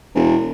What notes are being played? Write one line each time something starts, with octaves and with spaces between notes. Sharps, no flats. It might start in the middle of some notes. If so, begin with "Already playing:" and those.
E1